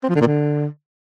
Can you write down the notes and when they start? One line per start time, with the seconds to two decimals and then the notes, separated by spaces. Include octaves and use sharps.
0.03 C4
0.09 F3
0.15 D3
0.21 A#2
0.27 D3